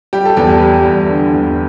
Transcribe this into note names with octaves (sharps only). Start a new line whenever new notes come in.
G3 G4
A4
E2 G4
G3
E2
D3
E2